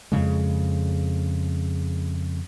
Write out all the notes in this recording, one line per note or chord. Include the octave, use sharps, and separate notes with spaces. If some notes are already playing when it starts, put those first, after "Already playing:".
F2 C#3 G#3